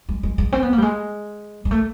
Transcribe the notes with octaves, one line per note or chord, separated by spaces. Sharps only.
G#3
G#3
G#3
C4
B3
A#3
G3
G#3
G#3
A3